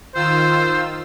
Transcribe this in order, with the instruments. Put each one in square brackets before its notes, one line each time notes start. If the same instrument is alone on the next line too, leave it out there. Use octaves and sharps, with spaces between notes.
[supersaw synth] D#3 F4 E6 [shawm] C5